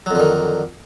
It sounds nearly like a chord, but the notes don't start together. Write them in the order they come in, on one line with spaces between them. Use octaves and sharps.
F#3 F2 D3 D#3